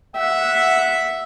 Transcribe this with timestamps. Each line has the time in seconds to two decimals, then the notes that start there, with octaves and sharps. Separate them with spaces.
0.16 E5 F#5